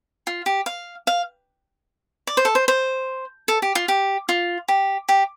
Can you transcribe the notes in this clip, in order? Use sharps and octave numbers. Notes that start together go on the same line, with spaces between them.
F4
G4
F5
F5
D5
C5
A4
C5
C5
A4
G4
F4
G4
F4
G4
G4